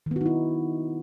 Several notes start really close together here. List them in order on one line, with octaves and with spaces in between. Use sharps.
D#3 B3 F#4 D#4 E4